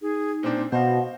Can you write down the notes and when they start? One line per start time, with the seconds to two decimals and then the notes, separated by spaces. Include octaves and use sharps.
0.02 D#4 G#4
0.43 A#2 C4 D4 C5
0.72 B2 C5 D#5 F5 F#5